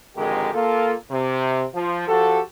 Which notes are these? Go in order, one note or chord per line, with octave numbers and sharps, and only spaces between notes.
G#1 F2 D3 G#3 G4 A#4
A#3 F4 A4
C3
F3
F3 F#4 G4 A4